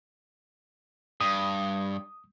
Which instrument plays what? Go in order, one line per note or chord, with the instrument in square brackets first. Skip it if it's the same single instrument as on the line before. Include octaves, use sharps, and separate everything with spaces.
[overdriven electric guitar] G2 [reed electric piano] D#6